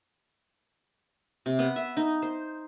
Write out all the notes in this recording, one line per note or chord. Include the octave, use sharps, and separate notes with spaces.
C3
B3
E5
D#4
C5